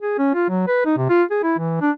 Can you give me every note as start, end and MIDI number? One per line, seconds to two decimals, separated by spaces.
0.01 0.17 68
0.18 0.29 61
0.34 0.48 65
0.49 0.66 54
0.68 0.82 71
0.86 0.94 63
0.97 1.09 48
1.09 1.23 65
1.31 1.40 68
1.43 1.54 64
1.58 1.81 52
1.81 1.90 62